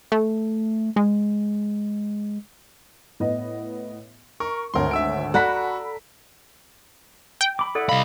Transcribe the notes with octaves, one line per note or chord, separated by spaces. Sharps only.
A3
G#3
A2 B3 D#5
A#4 C#6
G#1 D2 A#4 C#5 C6
E5 E6 D7
F#4 A4 D5 F#5 A#5 B5 B6
G5
B5 D6
E4 A4 D5 F#5
C2 D5 D#5 F5 B5